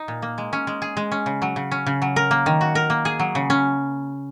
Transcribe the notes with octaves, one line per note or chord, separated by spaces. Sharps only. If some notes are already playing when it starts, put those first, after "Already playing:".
Already playing: D#4
A#2
A#3
G#3
C#4
G#3
G#4
G#3
C#4
C#3
F#3
C#3
C#4
C#3
F#3
A#4
A#3
D#3
F#4
A#4
A#3
G#4
F#3
C#3
C#4